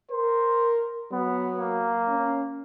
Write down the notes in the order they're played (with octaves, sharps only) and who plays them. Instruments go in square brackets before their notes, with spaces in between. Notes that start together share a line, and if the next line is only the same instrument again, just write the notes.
[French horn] A#4 [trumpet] C5
[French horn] F#3 [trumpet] B3
[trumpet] A#3
[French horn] C#4